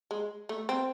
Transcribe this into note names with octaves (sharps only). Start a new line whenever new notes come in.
G#3
A3
C4